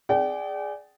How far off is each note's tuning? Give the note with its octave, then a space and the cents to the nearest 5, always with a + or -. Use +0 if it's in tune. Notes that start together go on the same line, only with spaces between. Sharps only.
G#4 +0 D5 +0 G5 -40